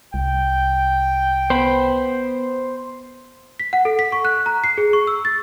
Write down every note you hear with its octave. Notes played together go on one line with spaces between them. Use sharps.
C2 G5
B3 C5 B5
B6
F#5
A4
B6
C#6
F#6
A#5
C7
G#4
C#6
E6
A6